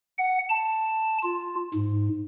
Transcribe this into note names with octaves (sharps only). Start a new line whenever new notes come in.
F#5
A5
F4
G#2